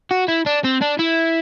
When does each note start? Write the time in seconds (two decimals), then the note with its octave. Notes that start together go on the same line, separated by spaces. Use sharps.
0.11 F#4
0.28 E4
0.46 D4
0.65 C4
0.82 D4
0.99 E4